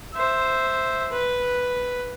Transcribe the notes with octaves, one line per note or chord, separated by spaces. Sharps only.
C5 E5
B4